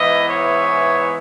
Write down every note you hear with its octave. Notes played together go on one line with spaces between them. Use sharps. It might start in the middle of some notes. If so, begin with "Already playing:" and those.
Already playing: G#2 E3 B3 E4 D#5
C#5